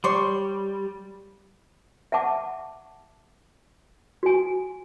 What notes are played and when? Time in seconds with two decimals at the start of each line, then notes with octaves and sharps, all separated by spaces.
0.04 G3 C#5 D5 C6
2.12 E5 F#5 A5 D6
4.23 F#4 G#5